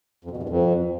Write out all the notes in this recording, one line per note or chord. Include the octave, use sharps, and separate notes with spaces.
F2
B2
E2
G2
F2